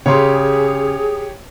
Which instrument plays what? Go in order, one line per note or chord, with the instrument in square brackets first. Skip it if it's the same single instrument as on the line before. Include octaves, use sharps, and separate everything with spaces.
[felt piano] C#3 C6 [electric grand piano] G4 C#5 [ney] G#4